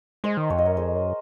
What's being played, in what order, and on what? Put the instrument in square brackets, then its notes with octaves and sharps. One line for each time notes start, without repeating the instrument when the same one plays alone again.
[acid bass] G#3 [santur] C5 D#5
[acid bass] D#3
[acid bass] F2 [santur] C#5
[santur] D#5
[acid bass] F#2 [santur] A#4 C#5
[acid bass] F2 [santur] G#4 C5
[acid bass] F#2